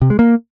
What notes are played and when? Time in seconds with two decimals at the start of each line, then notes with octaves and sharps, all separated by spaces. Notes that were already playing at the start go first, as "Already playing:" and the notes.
0.02 C3
0.10 G#3
0.19 A#3